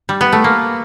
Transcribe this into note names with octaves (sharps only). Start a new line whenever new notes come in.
G3
B3
A3
A#3